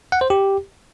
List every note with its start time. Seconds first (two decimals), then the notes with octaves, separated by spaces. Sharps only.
0.12 F#5
0.21 C5
0.30 G4